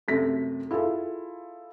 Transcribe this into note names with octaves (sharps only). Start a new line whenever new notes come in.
F#2 C3 A3 B6
E4 F4 G#4 A4